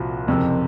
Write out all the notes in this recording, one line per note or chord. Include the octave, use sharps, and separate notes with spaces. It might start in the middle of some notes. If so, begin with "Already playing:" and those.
Already playing: C2 A#2 F3 C4 F#4
F#1 F2 C3